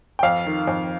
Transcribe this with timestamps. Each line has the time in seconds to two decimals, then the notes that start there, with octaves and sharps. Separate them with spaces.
0.19 G5
0.23 F2 F5
0.46 D#3
0.67 F2